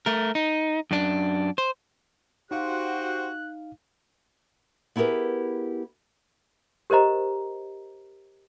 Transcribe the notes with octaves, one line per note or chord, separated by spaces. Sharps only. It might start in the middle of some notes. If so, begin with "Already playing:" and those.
A3 A#4
D#4
F#2 D4
C5
D#4 F#4 G4 C5 F5 F#6
B3 E4 G4 G#4 A#4 B4
G4 A#4 C5 D#5 A#5